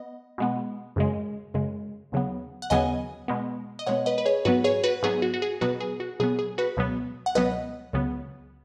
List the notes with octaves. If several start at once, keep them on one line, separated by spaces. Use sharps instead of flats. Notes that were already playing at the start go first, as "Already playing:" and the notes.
Already playing: B3 D#5
B2 G#3 B3
F#2 C#3 G#3
F#2 C#3 G#3
D#2 C#3 F#3 B3
F#5
D#2 C#3 F#3 B3 D#5 G#5
B2 G#3 B3
D#5
B2 G#3 B3 C#5 F#5
B4 D#5
B4
G#4 C#5
G#2 F#3 B3 F#4 B4
G#4 C#5
F#4 B4
G#2 F#3 B3 G#4
F#4
F#4
G#4
B2 F#3 B3 F#4 B4
G#4
F#4
B2 F#3 B3 G#4
G#4
F#4 B4
C#2 B2 F#3 B3
F#5
C#2 B2 F#3 B3 B4 D#5
C#2 C#3 F#3 B3